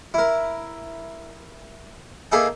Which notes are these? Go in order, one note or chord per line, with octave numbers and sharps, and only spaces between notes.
E4 A#4
A#3 D#4 G#4 A4 E5 G5